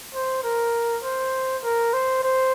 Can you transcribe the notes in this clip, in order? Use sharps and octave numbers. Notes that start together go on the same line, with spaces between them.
C5
A#4
C5
A#4
C5
C5